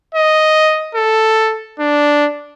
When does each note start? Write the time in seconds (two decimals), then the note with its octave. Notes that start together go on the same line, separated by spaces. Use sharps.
0.15 D#5
0.95 A4
1.80 D4